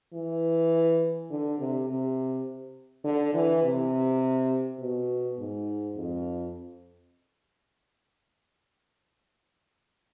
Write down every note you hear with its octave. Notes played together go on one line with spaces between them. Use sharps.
E3
D3
C3
C3
D3
E3
C3
B2
G#2
F2